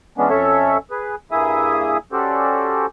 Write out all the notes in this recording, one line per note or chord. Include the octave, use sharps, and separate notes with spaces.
E3 G#3 B3 C#4 D4
F2 C#4 A4 C#5 E5
G#4 B4
G2 A#3 E4 G#4 E5 D#6
C#4 F#4 G4 A4 C5 D5